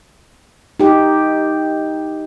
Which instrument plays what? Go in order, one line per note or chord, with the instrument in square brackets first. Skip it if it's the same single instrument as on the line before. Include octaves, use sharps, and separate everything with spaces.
[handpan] D#4 G4